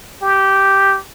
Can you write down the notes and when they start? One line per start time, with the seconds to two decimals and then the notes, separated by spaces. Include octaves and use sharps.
0.22 G4